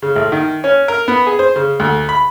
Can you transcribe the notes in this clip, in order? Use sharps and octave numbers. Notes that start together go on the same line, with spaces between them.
C#3
A1
D#3
C#4
A#4
B3
G#4
C5
C#3
D2
B5